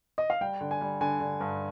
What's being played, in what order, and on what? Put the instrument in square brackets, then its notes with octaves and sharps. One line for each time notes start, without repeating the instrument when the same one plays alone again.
[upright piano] D#5
F5
[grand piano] G3 [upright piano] G5
[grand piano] D3
[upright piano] G#5
[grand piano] G3
[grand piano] D3 [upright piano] G#5
[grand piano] D3
G2